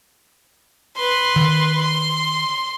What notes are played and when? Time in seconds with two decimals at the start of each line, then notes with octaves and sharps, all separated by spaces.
0.97 B4 C6
1.36 D#3
1.82 C6